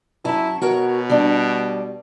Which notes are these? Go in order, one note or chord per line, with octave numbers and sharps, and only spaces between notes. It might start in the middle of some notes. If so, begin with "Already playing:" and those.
F#2 C#4 E4 A5
B2 F#4 A#4 C#5
G3 D4